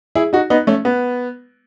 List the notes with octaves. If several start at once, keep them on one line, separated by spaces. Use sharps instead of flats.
E4 G#4
D#4 F#4
B3 D#4
A3 C#4
B3